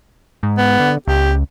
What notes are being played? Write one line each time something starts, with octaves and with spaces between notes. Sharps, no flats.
G#2
B3
D3
C#2 G4